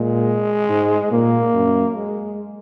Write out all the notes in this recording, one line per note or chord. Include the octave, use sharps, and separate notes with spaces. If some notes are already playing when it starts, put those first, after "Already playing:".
Already playing: A#2 G#3
G#2
A#2 A#3
F#2
G#3